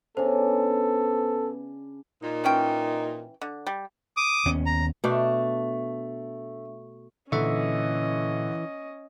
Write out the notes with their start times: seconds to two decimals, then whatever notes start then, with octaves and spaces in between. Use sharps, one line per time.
0.17 C#3 B3 D4 A4 C5 G#5
2.22 A#2 D#4
2.44 E3 C#4 G5
3.41 D3
3.66 G3
4.17 D6 D#6
4.46 D#2 B3 C#4
4.66 A#5
5.04 B2 A3 D4 G5
7.32 A#2 D3 E3 C#4 D#5 E5 C#6